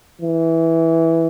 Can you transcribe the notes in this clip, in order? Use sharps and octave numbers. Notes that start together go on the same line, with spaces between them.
E3